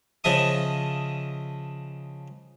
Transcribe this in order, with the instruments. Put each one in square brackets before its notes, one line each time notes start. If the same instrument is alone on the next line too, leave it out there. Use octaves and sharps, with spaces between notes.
[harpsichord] C#3 F3 D#5 E5 A5 D#6